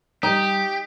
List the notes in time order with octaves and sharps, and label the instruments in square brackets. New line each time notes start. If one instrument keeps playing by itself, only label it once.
[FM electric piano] G3 [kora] D#4 [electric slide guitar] G4